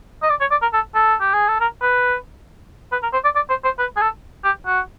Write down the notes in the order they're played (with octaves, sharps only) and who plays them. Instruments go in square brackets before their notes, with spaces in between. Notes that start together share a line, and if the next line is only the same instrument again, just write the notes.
[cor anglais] D#5
D5
C#5
D5
A#4
A4
A4
G4
G#4
A4
A#4
B4
B4
A#4
C5
D5
D5
C5
C5
B4
G#4
A4
G4
F#4